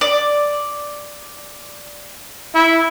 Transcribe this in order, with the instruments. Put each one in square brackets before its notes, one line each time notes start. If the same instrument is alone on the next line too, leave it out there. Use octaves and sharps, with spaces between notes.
[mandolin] D5
[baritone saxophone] E4